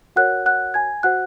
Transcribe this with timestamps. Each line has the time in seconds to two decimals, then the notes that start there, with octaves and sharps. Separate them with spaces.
0.16 F#4 A#4 C#5 F#5 F#6
0.46 F#5 F#6
0.74 G#5 G#6
1.03 F#4 C5 F#5 F#6